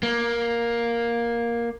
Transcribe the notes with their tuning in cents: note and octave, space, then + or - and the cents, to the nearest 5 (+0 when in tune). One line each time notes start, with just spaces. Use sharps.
A#3 +10